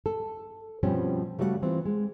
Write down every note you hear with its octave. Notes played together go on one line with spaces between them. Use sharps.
A4
G2 B2 F3 G3 C4 C#4
C#3 G3 A3 F#4 D5 F#5
E3 C4 F4
G#3